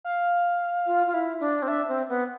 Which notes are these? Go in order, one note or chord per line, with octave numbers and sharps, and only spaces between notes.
F5
F4
F4
E4
D4
C4
D4 E5
C4
B3